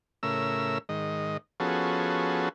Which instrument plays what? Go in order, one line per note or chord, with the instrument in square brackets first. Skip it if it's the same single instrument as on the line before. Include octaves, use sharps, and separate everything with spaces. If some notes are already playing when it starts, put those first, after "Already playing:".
[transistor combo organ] A2 C#3 A#4 E5 E6
G#2 D#3 D#5
F3 B3 C#4 F#4 G#4 A4